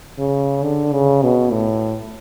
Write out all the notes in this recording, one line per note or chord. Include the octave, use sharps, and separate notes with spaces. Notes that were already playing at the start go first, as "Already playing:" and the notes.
C#3
D3
C#3
B2
A2